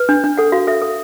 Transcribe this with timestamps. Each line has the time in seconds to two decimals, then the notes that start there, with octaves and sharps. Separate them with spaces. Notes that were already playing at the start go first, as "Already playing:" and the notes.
Already playing: B4
0.09 D4
0.24 D4
0.38 A4 F#5
0.52 F#4 F5
0.67 A4 E5
0.82 A4